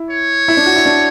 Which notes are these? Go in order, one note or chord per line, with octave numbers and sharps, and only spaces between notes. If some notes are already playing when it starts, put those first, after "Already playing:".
Already playing: E4
C#5
E4
D4
F#4
E4
D4